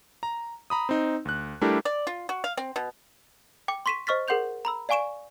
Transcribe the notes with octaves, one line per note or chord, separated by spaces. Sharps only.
A#5
A#5 B5 D#6
C4 D#4
D2 F#6
G3 A3 D4 E4 G4 A#4
D5
F4
F#4
F5
C4
B2
G5 D6
C6 C#6 B6 D#7 E7
C5 D#5 C#6 F6 A6 B6
G#4 A#4 F#5 C6 G6 F7
A#5 B5 E6
D5 F5 G#5 C#6 D7 E7